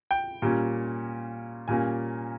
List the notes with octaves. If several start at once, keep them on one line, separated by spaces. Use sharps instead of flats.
G5
A#2 G3 A#3 C#4
A#2 G3 A#3 C#4 G#5